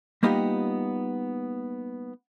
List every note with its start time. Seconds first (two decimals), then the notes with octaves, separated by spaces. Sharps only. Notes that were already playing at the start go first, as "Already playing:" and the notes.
0.23 G3 A#3 B3 D#4 F4 G4